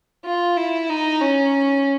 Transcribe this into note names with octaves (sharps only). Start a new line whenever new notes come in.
F4
E4
D#4
C#4